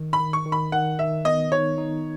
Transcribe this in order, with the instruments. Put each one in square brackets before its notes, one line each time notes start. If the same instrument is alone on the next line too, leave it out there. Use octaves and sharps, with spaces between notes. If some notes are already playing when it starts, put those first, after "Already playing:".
Already playing: [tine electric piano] D#3
[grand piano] B5
[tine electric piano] D#3
[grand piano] C#6
[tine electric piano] D#3
[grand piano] B5
[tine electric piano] D#3 [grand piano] F#5
[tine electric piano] D#3 [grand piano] E5
[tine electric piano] B3 [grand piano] D#5
[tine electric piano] D#4 [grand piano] C#5
[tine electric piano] D#4